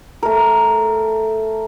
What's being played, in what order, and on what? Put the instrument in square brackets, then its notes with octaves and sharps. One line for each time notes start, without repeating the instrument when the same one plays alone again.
[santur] A3 A#4